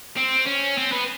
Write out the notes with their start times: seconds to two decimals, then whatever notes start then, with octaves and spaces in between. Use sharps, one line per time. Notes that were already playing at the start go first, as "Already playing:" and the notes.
0.17 C4
0.47 C#4
0.78 C4
0.92 B3